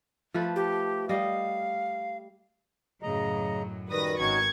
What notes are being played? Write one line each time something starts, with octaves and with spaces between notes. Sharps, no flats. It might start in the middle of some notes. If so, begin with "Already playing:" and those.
F3 A3 B4
G4
G3 D#5 F5
F#2 A2 C#3 F#3 D#5 A#5
F#2 D#3 G3 B4 D#6 A#6
G#1 D#3 C#4 D#4 F#4 C#6 G#6